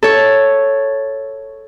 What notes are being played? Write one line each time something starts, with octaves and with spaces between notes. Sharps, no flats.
A4 C#5